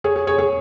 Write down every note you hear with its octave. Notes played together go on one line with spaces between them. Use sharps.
G#4 C#5
G#4 C#5
G#4 C#5
G#4 C#5